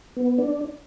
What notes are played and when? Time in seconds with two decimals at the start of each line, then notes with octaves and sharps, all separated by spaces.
0.16 B3
0.38 D4